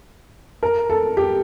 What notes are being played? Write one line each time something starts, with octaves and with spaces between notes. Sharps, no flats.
A#4
A4
G4